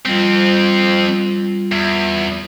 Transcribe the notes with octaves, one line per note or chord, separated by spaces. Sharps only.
F2 G3 C4 F4
E2